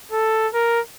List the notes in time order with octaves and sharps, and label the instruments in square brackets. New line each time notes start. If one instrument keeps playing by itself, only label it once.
[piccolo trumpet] A4
A#4